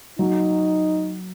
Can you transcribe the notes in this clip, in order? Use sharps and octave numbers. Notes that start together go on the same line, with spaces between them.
F#3 D#4